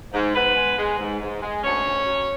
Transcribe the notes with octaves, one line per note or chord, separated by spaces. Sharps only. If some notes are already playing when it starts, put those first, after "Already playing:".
G#2
G#2 B3 B4
G#3
G#3
G#2
G#2
G#3
D2 C#4 C#5
D2
F#3